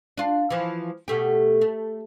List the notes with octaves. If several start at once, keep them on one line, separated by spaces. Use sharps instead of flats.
D4 F4
E3 F3
B2 A3 G4
A3